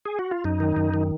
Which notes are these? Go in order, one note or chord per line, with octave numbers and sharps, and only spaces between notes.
G#4
F#4
F4
F#2 D#4
D#3
F#2
D#3